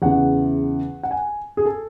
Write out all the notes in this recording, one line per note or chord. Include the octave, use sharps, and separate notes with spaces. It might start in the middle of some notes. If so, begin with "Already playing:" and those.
E2 C#3 E3 F#5
F#5
G#5
G#4
A4